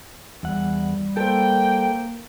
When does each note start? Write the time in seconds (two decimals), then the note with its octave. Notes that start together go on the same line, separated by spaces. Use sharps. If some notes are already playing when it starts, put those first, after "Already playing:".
0.43 E2 G3 F#5
1.17 A#3 A4 C5 G5